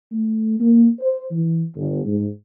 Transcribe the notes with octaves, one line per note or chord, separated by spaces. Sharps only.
A3
A#3
C5
E3
G1
G#2